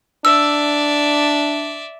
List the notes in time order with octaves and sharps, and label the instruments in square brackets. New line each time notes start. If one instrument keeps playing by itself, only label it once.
[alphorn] D4 [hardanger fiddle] D5 E5 [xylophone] E6